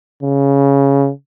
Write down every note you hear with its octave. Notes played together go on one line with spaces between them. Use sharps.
C#3